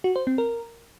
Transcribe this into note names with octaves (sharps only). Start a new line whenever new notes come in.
F#4
C5
C4
A#4